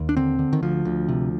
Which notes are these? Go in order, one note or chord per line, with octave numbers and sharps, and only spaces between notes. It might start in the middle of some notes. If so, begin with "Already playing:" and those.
Already playing: D#2
D4
D3 C4
D3
D#3
D2 F3
D2
C3